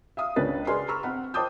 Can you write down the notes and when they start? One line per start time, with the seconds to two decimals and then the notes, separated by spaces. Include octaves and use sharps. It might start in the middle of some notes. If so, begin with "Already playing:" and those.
0.17 E5 F5 D#6
0.36 C#2 C#3 C#4 D4 B4 A6
0.67 G#4 B4 D5 G#5 C6 F6
0.88 A#5 B5 C#6 E6 F6
1.03 C4 F#5 B5
1.34 C5 G5 A5 D6 D#6 G6